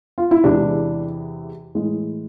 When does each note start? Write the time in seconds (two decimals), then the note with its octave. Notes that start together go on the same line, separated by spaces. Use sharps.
0.18 F4
0.31 E4
0.44 E2 C3 E3 G#3 D4
1.75 A2 E3 G#3